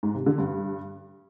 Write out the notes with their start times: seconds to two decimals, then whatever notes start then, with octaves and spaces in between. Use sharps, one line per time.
0.03 G#2
0.15 C3
0.26 D3
0.38 G2